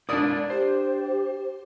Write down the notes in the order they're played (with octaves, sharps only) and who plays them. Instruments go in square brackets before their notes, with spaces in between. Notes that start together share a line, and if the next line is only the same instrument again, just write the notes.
[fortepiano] D4 D#6 [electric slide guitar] E4 A#4 D5
[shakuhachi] G4 [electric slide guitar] C5